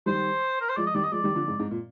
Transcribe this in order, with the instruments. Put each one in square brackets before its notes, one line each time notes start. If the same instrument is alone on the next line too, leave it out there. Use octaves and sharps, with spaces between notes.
[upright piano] D#3 G3 [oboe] C5
[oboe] A#4
C5
[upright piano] F3 G#3 [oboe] D5
[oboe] D#5
[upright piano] D#3 G3 [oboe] D5
[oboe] D#5
[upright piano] F3 G#3 [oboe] D5
[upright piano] D#3 G3
D3 F3
G#2
G#2
A#2